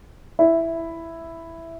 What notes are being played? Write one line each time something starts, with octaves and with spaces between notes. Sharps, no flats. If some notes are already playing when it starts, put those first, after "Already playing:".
E4